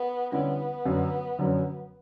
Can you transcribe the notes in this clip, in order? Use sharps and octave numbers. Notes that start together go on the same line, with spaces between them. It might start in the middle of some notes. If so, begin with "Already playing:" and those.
Already playing: B3
D3 G3 B3 C#4 E4
F#2 D3 F#3 C#4
F#2 D3 F#3 C#4